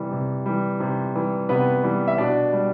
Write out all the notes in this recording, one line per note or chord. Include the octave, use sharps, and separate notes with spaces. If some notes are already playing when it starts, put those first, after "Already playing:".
Already playing: C3 E3 G3
C3
E3 G3
C3
E3 G3
C3 B3 B4
E3 G3
E5
B2 D4 D5
G3